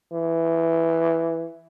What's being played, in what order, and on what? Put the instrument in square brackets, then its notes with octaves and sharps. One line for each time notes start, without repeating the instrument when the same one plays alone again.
[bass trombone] E3